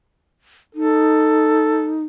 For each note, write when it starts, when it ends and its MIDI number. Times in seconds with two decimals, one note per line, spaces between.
0.75 2.04 63
0.75 1.95 69